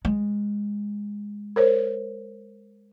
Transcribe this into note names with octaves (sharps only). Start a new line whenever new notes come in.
G#3
A#4 C5 C#5